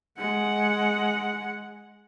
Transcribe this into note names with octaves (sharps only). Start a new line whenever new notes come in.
G#3 F#5